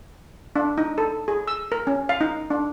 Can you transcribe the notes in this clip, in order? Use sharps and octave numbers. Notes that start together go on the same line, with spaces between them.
D4
D#4
A4
G#4
E6
A#4
C#4
F5
D#4
D4